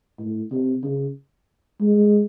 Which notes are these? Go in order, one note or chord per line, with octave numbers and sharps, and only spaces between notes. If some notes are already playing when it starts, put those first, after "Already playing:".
A2
C3
C#3
G#3